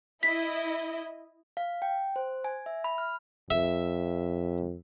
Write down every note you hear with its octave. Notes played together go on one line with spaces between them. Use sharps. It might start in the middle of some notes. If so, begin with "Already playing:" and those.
E4 D#5 B6
F5
G5
C5
G#5
E5
B5
F6
F2 E5